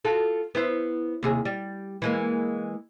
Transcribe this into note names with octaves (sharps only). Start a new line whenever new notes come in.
F4 F#4 A4
B3 E4 C5
D#2 C3 G#4
G3
E3 G#3 A#3